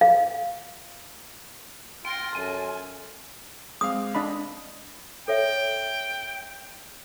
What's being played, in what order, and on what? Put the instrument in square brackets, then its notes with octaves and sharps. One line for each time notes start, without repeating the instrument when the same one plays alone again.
[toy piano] F5
[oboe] F4 [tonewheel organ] G5 [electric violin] C6 A#6
[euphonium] F#2 [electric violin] A4 [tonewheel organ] G#5
[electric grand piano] G#3 C4 F5 [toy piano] D#6
[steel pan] D4 D#5 B5
[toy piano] A4 C#5 E5 [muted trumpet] G5